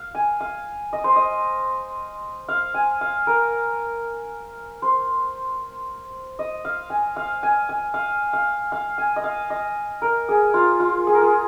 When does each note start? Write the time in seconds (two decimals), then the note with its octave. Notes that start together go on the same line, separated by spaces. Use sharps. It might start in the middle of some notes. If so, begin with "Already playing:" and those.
Already playing: F5
0.15 G#5
0.40 F5
0.93 D#5
1.04 C5
1.16 D#5
2.48 F5
2.74 G#5
3.01 F5
3.27 A#4
4.82 C5
6.39 D#5
6.65 F5
6.90 G#5
7.16 F5
7.43 G#5
7.69 G#5
7.94 F5
8.33 F5
8.72 F5
8.98 G#5
9.16 D#5
9.24 F5
9.50 D#5
10.02 A#4
10.29 G#4
10.54 F4
10.80 F4
11.07 G#4
11.15 A#4
11.21 G#4